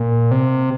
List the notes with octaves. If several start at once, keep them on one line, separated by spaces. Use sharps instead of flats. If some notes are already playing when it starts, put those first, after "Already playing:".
Already playing: A#2
C3